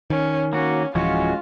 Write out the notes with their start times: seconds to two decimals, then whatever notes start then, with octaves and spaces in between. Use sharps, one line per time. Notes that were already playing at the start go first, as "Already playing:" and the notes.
0.10 D#3 C#4
0.53 A#3 C#4 F#4
0.95 D1 E3 F3 G#3 C#4 F4 F#4